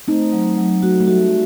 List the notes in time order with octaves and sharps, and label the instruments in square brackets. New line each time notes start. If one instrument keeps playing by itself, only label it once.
[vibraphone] A3 [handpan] C4 D#4
[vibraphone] F#3
F#3
[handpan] A3 [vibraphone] F#4
[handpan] A3
[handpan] G3 [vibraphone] F#4